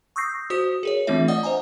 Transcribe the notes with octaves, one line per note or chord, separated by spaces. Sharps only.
C#6 D#6 E6 G6 A#6 C7
F#4 C5 D#6
G#4 A#4 C#5
E3 A3 C4 D4 F4 E5
D5 D#5 F#5 D#6
C5 D#5 G#5 A#5